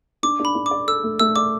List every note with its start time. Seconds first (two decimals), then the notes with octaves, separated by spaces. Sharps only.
0.23 D4 D6
0.40 D4
0.45 B5
0.55 D4
0.66 D6
0.71 D5
0.87 A4 E6
1.04 A3
1.20 A3 E6
1.36 D5 D6